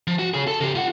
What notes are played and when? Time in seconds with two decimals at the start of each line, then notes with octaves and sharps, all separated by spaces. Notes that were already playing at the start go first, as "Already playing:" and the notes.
0.07 F3
0.19 F#4
0.34 G#4 C#5
0.47 A4
0.61 C#3 G4
0.75 F4 F#5